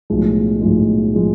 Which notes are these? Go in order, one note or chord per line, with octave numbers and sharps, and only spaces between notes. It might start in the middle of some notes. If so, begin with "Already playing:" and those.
B1 A2 F3 G#3
B1 A2 F3 G#3
A2 F3 G#3